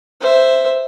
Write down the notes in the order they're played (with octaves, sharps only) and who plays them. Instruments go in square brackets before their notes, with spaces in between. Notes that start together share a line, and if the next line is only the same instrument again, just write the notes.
[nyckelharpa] C5 E5